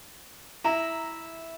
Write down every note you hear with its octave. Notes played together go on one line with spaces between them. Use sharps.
E4 A#5